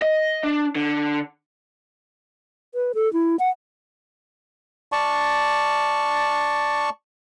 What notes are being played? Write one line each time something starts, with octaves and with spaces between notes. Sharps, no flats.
D#5
D4
D3
B4
A4
E4
F#5
D5 A5 C#6